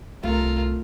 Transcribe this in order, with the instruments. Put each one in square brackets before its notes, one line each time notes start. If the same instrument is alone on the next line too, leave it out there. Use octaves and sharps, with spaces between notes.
[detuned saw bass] C2 [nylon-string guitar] A3 [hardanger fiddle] F4 A#4